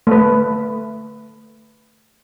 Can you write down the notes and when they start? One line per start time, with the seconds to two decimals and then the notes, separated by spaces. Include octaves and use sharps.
0.07 A3 B4